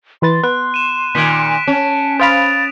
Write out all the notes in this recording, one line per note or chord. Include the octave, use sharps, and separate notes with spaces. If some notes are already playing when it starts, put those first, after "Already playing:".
E3 B4 C6 A6
B3 F#6
D#7 E7
A#2 D#3 B6 D7
C#4 A5
C5 F5 B5 D#6 A6 D7 F7